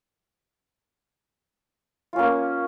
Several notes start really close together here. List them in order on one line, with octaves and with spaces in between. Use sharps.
F4 C#4 A#3